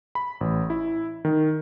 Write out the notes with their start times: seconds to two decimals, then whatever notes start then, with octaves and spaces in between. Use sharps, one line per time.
0.15 B5
0.41 A1
0.70 E4
1.25 D#3